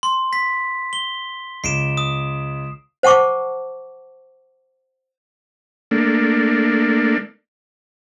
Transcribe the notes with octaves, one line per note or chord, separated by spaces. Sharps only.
C6
B6
G7
C#2 C7 D7 E7
D#6
C5 F#5 A5 C#6 D6
A3 A#3 D4